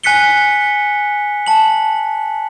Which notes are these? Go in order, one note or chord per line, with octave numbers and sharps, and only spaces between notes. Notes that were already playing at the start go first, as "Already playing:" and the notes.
G#5 F#6 B6 C#7 G7
A5 F#7